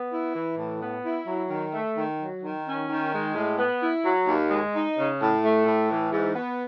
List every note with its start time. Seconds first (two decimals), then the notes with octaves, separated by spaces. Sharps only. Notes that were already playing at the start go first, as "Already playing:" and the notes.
Already playing: B3
0.11 E4
0.34 E3
0.57 A2
0.81 B3
1.04 E4
1.27 F#3
1.50 D#3
1.74 A3
1.96 D#3
2.20 F#3
2.42 D#3
2.66 C#4
2.89 D#3
3.12 G#3
3.35 A2
3.58 B3
3.81 E4
4.04 F#3
4.28 D#2
4.50 G#3
4.74 D#4
4.97 C#3
5.21 A2
5.43 A3
5.66 A2
5.90 E3
6.13 G#2
6.36 B3